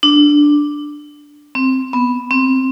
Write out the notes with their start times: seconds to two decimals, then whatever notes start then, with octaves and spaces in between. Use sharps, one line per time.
0.03 D4
1.55 C4
1.93 B3
2.31 C4